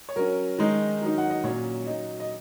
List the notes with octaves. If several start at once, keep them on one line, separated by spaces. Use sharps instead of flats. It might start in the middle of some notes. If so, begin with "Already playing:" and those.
C#5
F#3 C#4 A#4
D#3 G#3 D#4
D#3 F#3 D#4
F#5
D#5
A#2 F#3 C#4 C#5
F#3 D#4 D#5
D#5